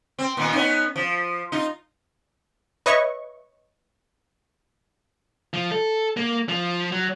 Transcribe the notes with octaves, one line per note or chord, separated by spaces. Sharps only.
C4
A#2 D#3 B3
B3 C#4 D#4
F3
D#4 F4
B4 C#5 D#5 E5 C#6
F3
A4
A#3
F3
F#3